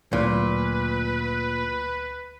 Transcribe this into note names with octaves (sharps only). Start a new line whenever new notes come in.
D2 A#2 F#3 A3 B4